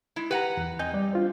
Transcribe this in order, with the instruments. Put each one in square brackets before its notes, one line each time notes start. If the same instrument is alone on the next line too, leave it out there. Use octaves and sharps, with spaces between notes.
[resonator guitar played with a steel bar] G#3 E4
[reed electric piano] G4 [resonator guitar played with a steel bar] B4 F#5 A#5
[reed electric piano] E2
[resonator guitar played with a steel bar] C4 [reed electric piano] D#5 G#5 G6
[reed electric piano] G3 D5
D4 F4 C5